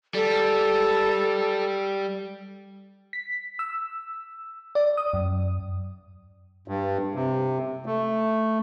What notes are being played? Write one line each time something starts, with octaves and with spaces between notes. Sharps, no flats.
G3 A4
B6
E6
D5
D#6
F#2
G2
C3
A3